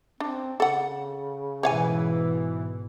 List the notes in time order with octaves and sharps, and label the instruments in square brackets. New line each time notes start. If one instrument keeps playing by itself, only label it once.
[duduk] C4 [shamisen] D4
[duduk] C#3 [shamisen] A4 F#5
[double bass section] G#2 B2 E3 [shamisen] C#5 F5 G#5